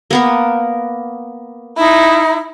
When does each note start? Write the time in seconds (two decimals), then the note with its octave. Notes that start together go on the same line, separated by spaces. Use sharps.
0.11 A#3 B3 A#4
1.78 D#4 E4